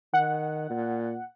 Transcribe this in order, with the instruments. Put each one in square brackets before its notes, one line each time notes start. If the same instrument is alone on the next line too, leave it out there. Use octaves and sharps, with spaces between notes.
[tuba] D#3 [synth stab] F#5
[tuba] A#2